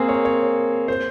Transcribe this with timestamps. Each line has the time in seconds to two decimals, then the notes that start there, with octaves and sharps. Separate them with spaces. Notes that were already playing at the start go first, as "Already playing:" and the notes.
Already playing: A#3 C4 G#4
0.09 C#5
0.25 C#5
0.88 C5